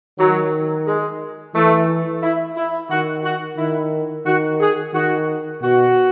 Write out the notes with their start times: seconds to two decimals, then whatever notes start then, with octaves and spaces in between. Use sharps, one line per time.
0.19 D#3 F#3
0.87 G#3
1.55 E3 A3
2.23 E4
2.57 E4
2.90 D#3 F#4
3.24 F#4
3.58 D#3 E4
4.26 D#3 F#4
4.60 G#4
4.94 D#3 F#4
5.62 B2 F#4